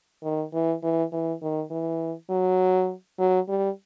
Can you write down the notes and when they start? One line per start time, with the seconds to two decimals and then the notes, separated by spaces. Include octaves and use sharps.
0.23 D#3
0.53 E3
0.83 E3
1.12 E3
1.42 D#3
1.71 E3
2.30 F#3
3.19 F#3
3.49 G3